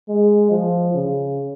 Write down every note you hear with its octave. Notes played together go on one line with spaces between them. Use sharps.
G#3
F3
C#3